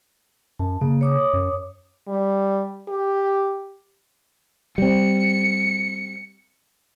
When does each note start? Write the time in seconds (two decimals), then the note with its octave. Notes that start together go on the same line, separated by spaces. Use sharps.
0.59 F#2 A5
0.81 C#3 A#3
1.01 C#5 D6 D#6
1.33 F#2
2.08 G3
2.88 G4
4.78 G3 C4 C#7